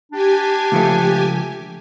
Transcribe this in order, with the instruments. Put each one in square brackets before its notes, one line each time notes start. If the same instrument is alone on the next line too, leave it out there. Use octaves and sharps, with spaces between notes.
[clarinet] D4 [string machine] G4 G#5
[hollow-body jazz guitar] C#2 F3 A3